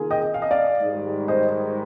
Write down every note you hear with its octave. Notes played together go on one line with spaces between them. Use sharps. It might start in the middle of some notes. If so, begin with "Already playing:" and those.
Already playing: C3 D#3 A#3 F4 G#4
D#5 G5
F5
D#5
D5 F5
G#2 D#3 G3
C5 D#5